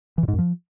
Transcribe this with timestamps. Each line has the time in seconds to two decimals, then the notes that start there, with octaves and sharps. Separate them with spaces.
0.18 E3
0.23 A#2
0.28 G#2
0.33 F#2
0.39 F3